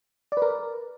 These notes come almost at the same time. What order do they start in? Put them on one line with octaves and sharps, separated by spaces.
D5 B4 A#4